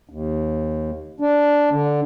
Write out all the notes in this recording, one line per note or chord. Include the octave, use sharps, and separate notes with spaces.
D#2
D4
D3